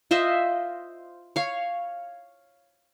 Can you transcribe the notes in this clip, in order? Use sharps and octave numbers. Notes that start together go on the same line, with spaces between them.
F4 C5 D#5 E5
C#5 F5